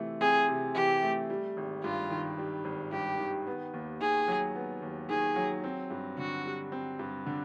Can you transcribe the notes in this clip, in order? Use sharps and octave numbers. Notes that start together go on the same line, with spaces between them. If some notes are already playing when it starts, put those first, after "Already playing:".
Already playing: C3 E3 A3 C4
C4 G#4
C3
E3 G4
A3
G3
G#1
G2 F4
D#3
G3
G#1
G2 G4
D#3
B3
D#2
D#3 G#4
F#3
B3
D#2
D#3 G#4
F#3
C4
G2
D3 F#4
G3
C4
G2
D3